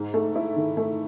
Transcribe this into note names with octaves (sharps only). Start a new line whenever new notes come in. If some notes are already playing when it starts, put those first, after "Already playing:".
Already playing: G#2
A3
E4
D#3
A3